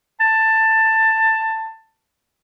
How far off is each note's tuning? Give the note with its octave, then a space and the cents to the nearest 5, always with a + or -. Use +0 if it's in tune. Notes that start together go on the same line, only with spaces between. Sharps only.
A5 +15